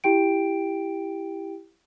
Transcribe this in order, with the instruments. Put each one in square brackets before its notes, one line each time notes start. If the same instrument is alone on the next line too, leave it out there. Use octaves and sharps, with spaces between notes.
[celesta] E4 G4 G5 D7